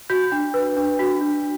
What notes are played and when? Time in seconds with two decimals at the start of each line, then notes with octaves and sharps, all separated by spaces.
0.10 F#4 G6
0.32 D4
0.54 B4
0.77 D4
0.99 F#4
1.21 D4